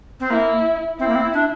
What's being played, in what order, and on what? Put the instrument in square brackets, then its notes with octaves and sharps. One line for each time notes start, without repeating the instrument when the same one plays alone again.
[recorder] C4
[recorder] A#3 [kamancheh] E4
[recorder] C4 [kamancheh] E4
[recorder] A#3
C4
D4